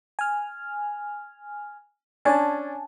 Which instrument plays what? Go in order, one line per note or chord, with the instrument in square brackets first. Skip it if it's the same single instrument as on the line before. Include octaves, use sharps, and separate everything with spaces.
[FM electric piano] G#5 F6
[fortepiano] C#4 D4 [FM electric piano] G#5 A5